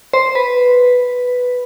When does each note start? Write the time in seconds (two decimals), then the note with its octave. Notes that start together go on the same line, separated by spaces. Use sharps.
0.13 C5
0.35 B4